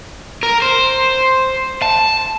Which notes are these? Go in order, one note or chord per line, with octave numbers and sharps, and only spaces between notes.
A#4
C5
A5